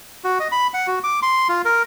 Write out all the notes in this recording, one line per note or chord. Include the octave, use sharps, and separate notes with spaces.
F#4
D#5
B5
F#5
F#4
D6
C6
F4
A#4